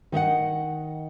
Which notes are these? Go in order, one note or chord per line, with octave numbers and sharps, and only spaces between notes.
D#3 D#5 E5 F#5